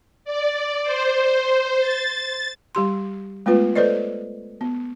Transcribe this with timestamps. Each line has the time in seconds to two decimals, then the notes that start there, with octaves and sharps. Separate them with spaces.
0.25 D5
0.83 C5
1.80 A6
2.75 G3 G4 C6
3.46 G#3 A3 B3 F4 B4
3.76 A4 B4 C5 D5 D#5
4.61 B3